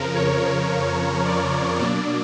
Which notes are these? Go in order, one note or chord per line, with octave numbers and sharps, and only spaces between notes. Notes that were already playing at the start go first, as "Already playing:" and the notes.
Already playing: F2 C#3 F3 A#4
C#5
D5
B2 F#3 A#3 D4 D5